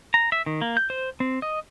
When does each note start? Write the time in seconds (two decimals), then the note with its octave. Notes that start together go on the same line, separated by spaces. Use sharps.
0.14 A#5
0.32 E5
0.46 D#3
0.62 A#3
0.77 G6
0.90 C5
1.20 C4
1.42 D#5